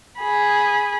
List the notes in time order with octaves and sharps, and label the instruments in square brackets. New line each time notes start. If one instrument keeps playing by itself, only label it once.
[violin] G#4 B5